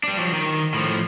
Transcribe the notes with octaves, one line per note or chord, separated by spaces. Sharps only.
G3 D4
F3 F#3
D#3
A2 F3